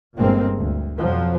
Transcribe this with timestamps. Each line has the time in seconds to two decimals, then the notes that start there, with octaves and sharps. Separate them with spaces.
0.17 G1 G2 A#2 G#3 A#3 C4
0.56 D2
0.97 F2 B2 F3 F#3